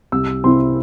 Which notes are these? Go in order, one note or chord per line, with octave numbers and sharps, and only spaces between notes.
C2 E6
C3 G3 C4 E4 C6